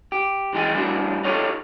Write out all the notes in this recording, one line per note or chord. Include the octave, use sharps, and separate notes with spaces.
G4
B1 E3 G#3 D#4 G5 G#5
A2 G3 D4 E4 F#4
D#4 F4 G4 A4 C#5